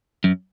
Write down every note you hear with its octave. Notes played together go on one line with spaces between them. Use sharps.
F#2